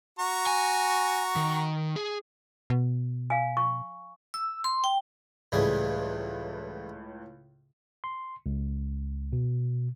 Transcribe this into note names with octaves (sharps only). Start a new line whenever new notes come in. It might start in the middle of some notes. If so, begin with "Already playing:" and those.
F#4 A#5 C#6
G#5
D#3
G#4
B2
F5 G#5
C#6
E6
C6
G5
C#2 A2 E3 G3 G#4
C6
C#2
B2